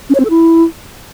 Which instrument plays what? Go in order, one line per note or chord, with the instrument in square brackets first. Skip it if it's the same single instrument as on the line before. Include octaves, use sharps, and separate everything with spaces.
[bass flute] C#4
C#5
C4
A4
E4